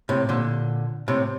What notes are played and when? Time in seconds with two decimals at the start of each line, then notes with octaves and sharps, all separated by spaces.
0.09 A2 C3
0.29 A#2 D3
1.08 A2 C3